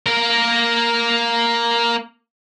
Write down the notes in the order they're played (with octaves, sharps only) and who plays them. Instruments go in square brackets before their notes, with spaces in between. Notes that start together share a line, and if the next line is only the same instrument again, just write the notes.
[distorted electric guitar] A#3 A#4